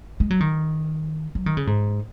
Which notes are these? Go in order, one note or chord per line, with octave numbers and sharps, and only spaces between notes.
G#3
F#3
D#3
F#3
D#3
C#3
G#2